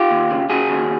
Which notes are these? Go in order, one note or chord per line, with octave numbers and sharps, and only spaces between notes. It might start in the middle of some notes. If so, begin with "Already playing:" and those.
Already playing: F4 G4
D#2
C#3
C#3 F#4 G#4
D#2